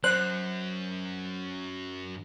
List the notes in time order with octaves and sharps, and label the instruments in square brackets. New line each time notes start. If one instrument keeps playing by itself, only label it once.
[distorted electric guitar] F#2 [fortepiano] C5 [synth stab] F#6